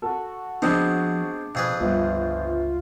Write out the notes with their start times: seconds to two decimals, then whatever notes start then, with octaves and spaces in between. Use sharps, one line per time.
0.02 F#4 A4
0.62 F3 G#3 B3 C4 D4
1.55 F2 B2 G#4 B4
1.80 G1 C#2 F4